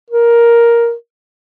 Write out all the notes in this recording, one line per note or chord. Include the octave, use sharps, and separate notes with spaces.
A#4